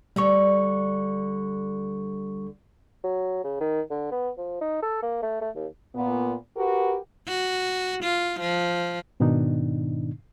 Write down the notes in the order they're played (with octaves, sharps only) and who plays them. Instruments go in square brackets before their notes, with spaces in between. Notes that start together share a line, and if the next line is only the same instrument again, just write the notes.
[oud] D2 D3 C#5 [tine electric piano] G3 C#6
[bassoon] F#3
C#3
D#3
D3
B3
F3
D#4
A4
A#3
A3
A3
D#2
[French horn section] A#2 B3
F#4 G4 A#4 B4
[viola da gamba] F#4
F4
F3
[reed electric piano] G#2 B2 D#3 B3 D4 D#4